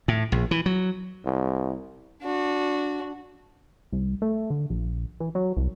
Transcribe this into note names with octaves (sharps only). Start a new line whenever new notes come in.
A2
A#1
E3
F#3
C2
D4 F#4
C2
A3
D3
A#1
E3
F#3
C2